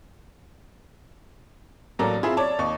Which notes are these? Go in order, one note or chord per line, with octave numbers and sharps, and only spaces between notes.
A1 F#3 A#3 A4 D5 A#5
C4 E4 F4 G#4
C#5 D5 A5
D#2 D#5 C#6